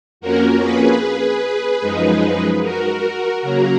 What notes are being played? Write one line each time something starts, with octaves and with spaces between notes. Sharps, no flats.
F2 F3 A#3 C#4 F#4 A#4
G#4 B4
F#2 F3 G#3 D#4
F#4 A#4
C#3 F#3 A#3 F#4 A#4